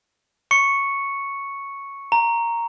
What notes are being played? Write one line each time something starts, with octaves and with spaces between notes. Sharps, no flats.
C#6 C#7
A#5